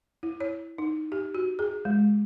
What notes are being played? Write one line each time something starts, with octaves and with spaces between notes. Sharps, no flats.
E4
C#5
D#4
G4
F#4
G#4
G#3